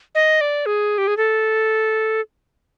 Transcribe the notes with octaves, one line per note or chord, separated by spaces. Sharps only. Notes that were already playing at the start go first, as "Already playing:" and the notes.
D#5
D5
G#4
G4
G#4
A4